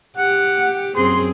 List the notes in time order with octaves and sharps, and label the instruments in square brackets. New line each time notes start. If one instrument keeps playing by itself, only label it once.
[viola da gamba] G4 [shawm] F#5
[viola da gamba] F#2 C4 G#4 [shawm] C6